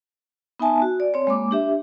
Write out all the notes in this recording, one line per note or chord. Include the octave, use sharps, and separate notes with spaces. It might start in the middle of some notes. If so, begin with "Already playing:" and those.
B3 D#4 E5 G#5 A5
F#4
D5
C4 C#5
G#3 A#3 D6
D4 G4 E5